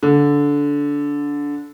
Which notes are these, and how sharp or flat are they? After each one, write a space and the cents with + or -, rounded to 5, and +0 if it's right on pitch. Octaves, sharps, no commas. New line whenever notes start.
D3 -20